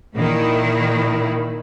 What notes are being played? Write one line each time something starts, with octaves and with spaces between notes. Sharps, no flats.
A#2 D#3 E4